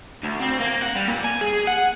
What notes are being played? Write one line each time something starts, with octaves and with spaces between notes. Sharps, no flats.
D2
C4
A#3
F#5
G3
A#2
G#5
G#4
F#5